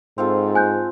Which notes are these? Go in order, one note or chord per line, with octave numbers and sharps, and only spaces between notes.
G#2 C4 F4 A4
G#5 F#6 G6